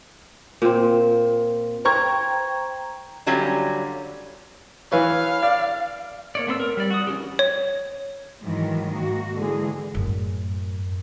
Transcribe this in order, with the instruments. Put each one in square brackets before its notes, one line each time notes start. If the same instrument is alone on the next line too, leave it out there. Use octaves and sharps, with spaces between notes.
[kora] A#2 C4
[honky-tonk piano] C5 G5 A#5 C#6 G#6
[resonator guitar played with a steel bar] D3 F#3 G3 C#4 F4
[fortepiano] E3 B4 C#5 [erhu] F5
[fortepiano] D5
[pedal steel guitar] A#3 C#5 D5
A3 B3 C4 B5 E6
A#4
G3 D5
F#4 D#6
E3 C#4 F#4 G4
[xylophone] C#5
[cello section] G#2 D#3 E3 F#3
G#2 A#3 F#4
D3 E3 G#3 G#4
[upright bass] F#2 A2